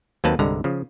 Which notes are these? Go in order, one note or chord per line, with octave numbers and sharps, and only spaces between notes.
D#2 F#3 A#3 C4 B4 A5
C2 G2 D3 G#3 A#5
C#3 F3